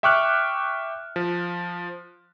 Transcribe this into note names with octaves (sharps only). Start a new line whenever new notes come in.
E5 G5 C#6 D6 F6 F#6
F3